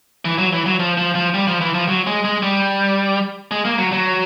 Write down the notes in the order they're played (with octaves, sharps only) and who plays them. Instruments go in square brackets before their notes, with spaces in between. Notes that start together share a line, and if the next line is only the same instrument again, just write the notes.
[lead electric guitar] E3
F#3
E3
F#3
F3
F3
F3
G3
F3
E3
F3
F#3
G#3
G#3
G3
G#3
A#3
F#3
F#3